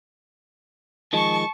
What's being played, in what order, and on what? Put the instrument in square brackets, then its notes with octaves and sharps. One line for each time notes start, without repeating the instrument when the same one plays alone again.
[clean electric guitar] D#3 F3 G#3 [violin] A5 C#6